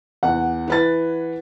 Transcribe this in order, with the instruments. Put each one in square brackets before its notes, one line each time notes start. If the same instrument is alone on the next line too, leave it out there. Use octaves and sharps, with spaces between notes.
[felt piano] E2 [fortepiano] F#5
[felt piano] E3 B4 A6